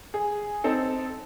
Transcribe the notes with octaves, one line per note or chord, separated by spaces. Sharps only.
G#4
C4 D#4 A4